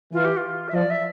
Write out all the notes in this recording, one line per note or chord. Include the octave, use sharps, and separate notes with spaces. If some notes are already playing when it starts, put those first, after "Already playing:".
E3 F4
G4
F4
E5
F3 D5
E5